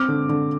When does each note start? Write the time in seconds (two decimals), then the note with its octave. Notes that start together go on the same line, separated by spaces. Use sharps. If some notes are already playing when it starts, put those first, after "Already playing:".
Already playing: C4 D6 F6
0.08 D3
0.29 D3